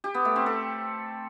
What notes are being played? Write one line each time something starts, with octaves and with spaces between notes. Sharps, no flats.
G4
B3
A3
C4
A4